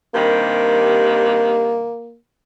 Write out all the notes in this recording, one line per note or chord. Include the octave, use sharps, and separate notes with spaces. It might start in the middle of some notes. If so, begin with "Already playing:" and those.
G2 C3 D#3 A#3